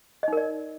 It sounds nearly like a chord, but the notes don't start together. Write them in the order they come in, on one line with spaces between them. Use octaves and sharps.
D#5 D#4 A#4 D5